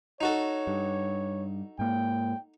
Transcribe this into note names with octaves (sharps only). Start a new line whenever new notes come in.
D#4 F#4 A4 C#5
G2
G#2 A#3 G5